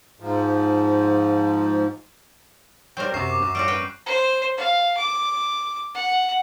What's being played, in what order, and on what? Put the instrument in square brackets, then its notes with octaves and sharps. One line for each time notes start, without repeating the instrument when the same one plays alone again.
[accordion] G#2 F3
[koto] F#3 A#4 [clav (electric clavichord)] G3 C5 G5
[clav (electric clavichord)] F#2 C3 [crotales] C#6 C7 E7
[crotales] D6
[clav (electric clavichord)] F#2
[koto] G3 C#4 F#4 [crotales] D6 D7
[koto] B4 G5
[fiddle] C5
F5
D6
F#5